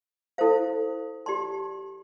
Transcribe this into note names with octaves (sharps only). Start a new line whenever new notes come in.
E4 A4 C5 F5
G4 D5 A5 C6